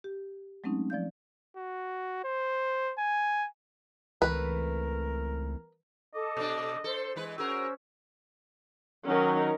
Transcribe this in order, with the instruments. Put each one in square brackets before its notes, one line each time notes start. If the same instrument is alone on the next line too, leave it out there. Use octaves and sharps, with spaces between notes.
[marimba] G4
F#3 G#3 A3 C4 C#4 D#4
F3 D5 F5 G6
[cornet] F#4
C5
G#5
[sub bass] C#2 [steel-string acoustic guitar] E3 A3 C4 [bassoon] A#4 [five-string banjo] B4
[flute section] A4 D6 [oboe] D#5
[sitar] B2 D4
[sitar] A4 [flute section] C5
[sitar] E3 G#3 B4
[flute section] C#4 C5 [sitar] F#4 G#4 A#4 [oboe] E6
[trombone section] D#3 F#3 [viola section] C#4 D#4 A#4